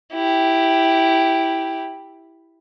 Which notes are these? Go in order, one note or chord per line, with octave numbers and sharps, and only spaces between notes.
E4 G4